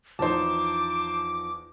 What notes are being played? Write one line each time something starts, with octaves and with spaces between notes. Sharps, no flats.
E2 F3 D#4 C5 A5 D6